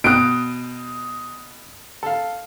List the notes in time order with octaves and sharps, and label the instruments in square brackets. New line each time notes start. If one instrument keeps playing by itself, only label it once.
[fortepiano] B2 G5 F#6 [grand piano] D#6 D7
[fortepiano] A4 F5